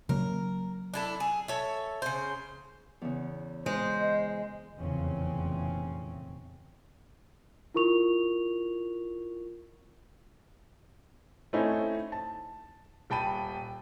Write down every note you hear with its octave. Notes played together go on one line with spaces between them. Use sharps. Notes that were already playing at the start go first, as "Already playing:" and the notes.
C#3 F#3 A#3 A#4
D4 E4 A4
G#4
A4 C#5 E5
C#3 C5
E2 C#3
G#3 C5
D#5
F1 E2 A#2 C#3 C4 C#4
E4 F4 A#4 C#6 F7
A3 C4 C#4 D#4 E4
A5
D#1 G5 A5 B5 D#7